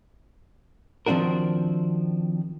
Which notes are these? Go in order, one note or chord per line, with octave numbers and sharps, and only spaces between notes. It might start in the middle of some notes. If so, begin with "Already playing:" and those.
D#3 F3 C4 D4 F#4 A#4